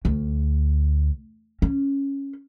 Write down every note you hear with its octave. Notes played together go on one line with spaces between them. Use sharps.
D2
C#4